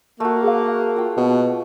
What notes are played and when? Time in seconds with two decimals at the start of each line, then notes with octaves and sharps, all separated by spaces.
0.20 A3 A#3 F#4
0.43 G#4 F5
0.96 F4 G5
1.17 B2